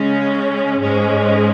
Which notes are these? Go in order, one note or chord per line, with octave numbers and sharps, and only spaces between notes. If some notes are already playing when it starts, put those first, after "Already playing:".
Already playing: C#3 G#3 C#4
G#2 G#3 C#4